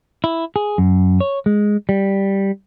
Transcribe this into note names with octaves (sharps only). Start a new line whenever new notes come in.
E4
G#4
F#2
C#5
G#3
G3